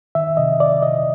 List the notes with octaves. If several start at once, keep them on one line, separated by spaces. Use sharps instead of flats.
D#3 E5
C3 D#5
C3 D5
C3 D#5